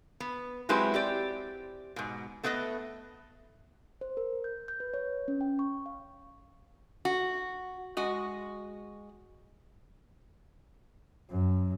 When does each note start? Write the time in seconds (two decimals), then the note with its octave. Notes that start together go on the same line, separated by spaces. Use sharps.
0.20 B3
0.69 F#3 G#3 C4 E4 G4 B4
0.94 C4 G4 D5
1.96 G#2 B2
2.43 A3 B3 B4 D5 D#5
4.01 C5
4.17 A#4
4.44 G6
4.68 G6
4.80 B4
4.94 C#5
5.28 C#4
5.41 G5
5.59 C#6
5.86 F5
7.05 F#4
7.97 G#3 F#4 D#5
11.30 F#2